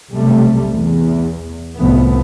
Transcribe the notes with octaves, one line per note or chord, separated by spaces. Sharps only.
B1 C3 G3 A3
E2
C2 A2 F3 A3 B3